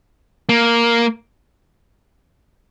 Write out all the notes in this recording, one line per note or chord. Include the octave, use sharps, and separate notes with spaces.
A#3